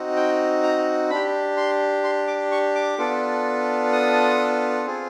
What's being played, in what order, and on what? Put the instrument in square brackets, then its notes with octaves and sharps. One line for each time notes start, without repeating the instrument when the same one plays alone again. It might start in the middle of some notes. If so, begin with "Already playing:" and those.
Already playing: [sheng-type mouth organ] C4 D#4 F#4
G5
A#5
D4 G4 B5
C6
C6
D6
C#6
D6
B3 D4 F4 A4
D#6
C4 F4 G#4